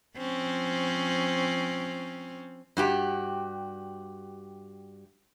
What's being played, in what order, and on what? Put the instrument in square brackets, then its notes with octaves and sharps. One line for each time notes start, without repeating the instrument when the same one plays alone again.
[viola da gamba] F3 C4 C#4
[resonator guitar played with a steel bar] G2 F#4 G4